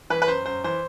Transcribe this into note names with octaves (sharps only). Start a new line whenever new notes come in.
E3 B4
B4
F#2 C5
F#2 C5
E3 C5